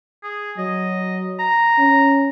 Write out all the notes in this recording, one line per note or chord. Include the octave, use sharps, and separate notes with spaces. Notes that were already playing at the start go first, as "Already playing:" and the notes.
G#4
F#3 D#5
A#5
C#4